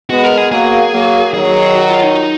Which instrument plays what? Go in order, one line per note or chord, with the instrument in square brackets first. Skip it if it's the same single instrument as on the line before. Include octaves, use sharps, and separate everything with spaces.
[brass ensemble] G#3 B3 [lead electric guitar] F#4
[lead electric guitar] A#4
G#4
[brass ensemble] F#3 A#3 [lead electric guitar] G#4
[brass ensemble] F#3 A#3
[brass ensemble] D#3 F#3 [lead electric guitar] G#4
[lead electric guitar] F#4
F4
D#4